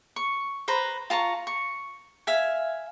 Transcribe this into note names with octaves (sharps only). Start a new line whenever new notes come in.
C#6
B4 C5 A#5
F4 A5 A#5 C#6
C#6
E5 F5 G#5